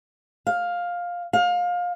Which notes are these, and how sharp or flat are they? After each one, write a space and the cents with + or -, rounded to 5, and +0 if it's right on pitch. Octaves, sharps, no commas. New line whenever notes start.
F5 +10
F5 +25